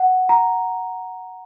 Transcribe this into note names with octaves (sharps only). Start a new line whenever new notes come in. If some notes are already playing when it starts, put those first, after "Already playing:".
Already playing: F#5
A#5